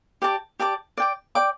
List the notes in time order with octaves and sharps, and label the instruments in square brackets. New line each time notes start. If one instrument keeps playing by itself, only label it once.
[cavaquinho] G4 D5 A5 D6
G4 D5 A5 D6
D5 G5 D6
D5 G5 D6